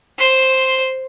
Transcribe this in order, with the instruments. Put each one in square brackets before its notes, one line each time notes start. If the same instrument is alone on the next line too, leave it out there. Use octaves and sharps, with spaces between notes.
[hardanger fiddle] C5 C6